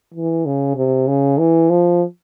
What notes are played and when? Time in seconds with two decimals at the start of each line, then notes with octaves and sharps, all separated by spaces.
0.14 E3
0.46 C#3
0.76 C3
1.08 C#3
1.38 E3
1.70 F3